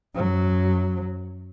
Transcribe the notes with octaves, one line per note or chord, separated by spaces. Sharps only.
F#2 F#3